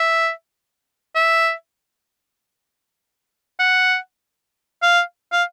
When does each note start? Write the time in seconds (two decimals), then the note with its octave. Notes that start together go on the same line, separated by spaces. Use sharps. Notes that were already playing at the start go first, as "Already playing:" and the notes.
Already playing: E5
1.15 E5
3.60 F#5
4.82 F5
5.32 F5